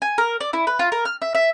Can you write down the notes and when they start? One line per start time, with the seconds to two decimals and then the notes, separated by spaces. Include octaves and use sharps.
0.02 G#5
0.18 A#4
0.40 D5
0.53 E4
0.67 B4
0.79 F4
0.92 A#4
1.05 F6
1.22 E5
1.35 E5